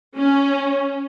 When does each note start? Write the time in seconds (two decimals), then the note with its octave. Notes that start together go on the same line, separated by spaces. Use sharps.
0.16 C#4